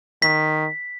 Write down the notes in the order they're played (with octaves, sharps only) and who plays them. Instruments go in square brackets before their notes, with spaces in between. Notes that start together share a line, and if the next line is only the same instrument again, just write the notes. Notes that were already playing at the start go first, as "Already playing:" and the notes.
[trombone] D#3 [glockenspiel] B6